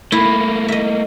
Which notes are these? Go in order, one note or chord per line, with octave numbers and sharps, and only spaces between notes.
A3 A#3 E4
D#5 E5